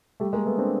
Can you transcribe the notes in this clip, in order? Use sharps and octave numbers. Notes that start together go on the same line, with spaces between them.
G3 A3
G#3 A#3
A3 B3
C4 D4